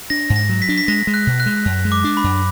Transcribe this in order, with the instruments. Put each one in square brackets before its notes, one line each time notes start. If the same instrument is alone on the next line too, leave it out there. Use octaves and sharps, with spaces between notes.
[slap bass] D4 [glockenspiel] A#6
[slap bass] G#2
[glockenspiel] A#6
[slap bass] F#3
[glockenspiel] B6
[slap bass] D4
[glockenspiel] B6
[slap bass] G#3 [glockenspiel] A#6
[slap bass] G#3
[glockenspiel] F#6
[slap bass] B2
[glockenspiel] F#6
[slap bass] G#3
F#2
G#3
[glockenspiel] D6
[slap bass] D4
[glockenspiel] B5
[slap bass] F#2